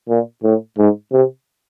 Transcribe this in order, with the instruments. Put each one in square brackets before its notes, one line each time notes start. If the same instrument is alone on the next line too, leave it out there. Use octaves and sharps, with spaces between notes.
[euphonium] A#2
A2
G#2
C3